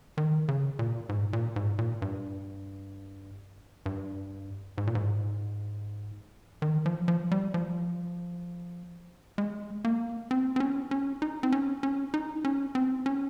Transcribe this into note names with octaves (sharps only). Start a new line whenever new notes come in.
D#3
C#3
A#2
G#2
A#2
G#2
A#2
G2
G2
G#2
A#2
G#2
D#3
F3
F3
G3
F3
G#3
A#3
C4
C4
C#4
C#4
D#4
C4
C#4
C#4
D#4
C#4
C4
C#4